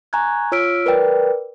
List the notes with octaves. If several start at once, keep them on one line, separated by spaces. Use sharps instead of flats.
G#5 A#5 C#6 F#6 G#6
F4 C#5 E6 F6 B6 D7
A#4 B4 D5 G5